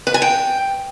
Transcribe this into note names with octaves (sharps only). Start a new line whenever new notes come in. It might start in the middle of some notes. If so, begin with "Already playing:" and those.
B4
G#5
G5